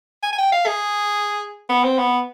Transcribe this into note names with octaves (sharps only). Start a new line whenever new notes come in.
G#5
G#5
G5
F5
G#4
B3
C4
B3